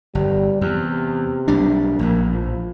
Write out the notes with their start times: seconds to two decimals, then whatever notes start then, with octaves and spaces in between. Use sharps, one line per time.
0.15 G1 G3
0.61 E2 C3
1.48 B1 G3 D4
1.99 A#1 A2 A#3
2.33 F3